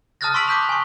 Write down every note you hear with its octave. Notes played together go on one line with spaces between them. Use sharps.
A5 D#6 F6 F#6 A6 A#6
C6 C#6 E6 B6 D7 F#7
D6 D#6 G6 B6 F7
G#5 C#6